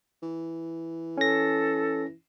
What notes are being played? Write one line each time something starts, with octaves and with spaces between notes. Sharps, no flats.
E3
C#4 A4 A#6